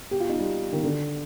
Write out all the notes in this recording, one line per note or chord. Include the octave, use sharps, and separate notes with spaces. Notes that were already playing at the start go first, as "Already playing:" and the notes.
G4
F4
D#4
G3
D#3
D3